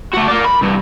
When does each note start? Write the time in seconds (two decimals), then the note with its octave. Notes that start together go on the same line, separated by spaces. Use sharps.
0.14 A3 F#4
0.28 A#4 D5
0.45 B5
0.62 C2 G2